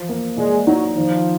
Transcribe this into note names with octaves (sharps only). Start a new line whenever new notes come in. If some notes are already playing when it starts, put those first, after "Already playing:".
Already playing: F3
A#3
A#2 G#3
F#3 D#4
D#3 F3